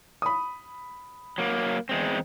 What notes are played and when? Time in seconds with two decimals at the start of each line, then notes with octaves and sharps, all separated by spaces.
0.22 B5 D#6
1.38 F#3 A#3
1.89 E2 G#3 C4